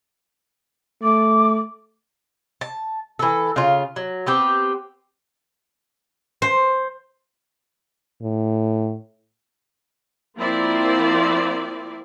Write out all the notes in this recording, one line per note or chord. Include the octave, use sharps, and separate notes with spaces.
A3 D6
A5
E3 A4
C#3 F4
F#3
B3 C4 G4
C5
A2
F3 A#3 C4 E4 D5